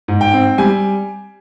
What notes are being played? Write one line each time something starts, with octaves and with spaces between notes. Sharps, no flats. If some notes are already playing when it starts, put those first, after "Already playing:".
G#2
G5
C4
G3 G#5